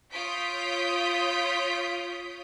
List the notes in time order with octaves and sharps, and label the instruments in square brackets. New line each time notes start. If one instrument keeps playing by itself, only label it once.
[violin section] F4 C#5 D#6 G6 B6 D7